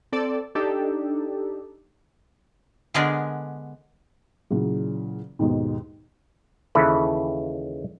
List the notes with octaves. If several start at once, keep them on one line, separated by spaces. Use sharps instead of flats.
C4 A4 D5
D4 D#4 G4 A4
D3 G#3 B3 D4 G#4 A#4
A#2 C#3 E3 F#3
D#2 G#2 B2
D#2 C#3 E3 E4 A4 B4